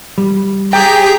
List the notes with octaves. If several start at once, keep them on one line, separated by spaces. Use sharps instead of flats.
G3
G4 G#4 G5 A#5 B6